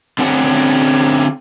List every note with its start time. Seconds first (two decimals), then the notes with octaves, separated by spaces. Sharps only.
0.19 D3 C4 C#4 F#5